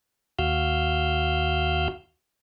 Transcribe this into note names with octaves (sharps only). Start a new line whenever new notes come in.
D#2 F#4 F5 E6 F6 G6